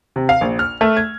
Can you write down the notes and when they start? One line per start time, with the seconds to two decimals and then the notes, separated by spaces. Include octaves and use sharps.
0.16 C3
0.29 F5
0.41 A#1
0.59 F6
0.81 A3
0.97 G#6